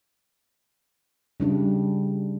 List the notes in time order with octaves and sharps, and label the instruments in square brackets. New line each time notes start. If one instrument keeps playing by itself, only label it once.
[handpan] C#3 G3 D4